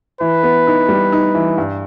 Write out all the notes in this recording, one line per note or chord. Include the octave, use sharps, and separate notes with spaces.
E3 B4
B3
D#4
G3
D#4
E3
G2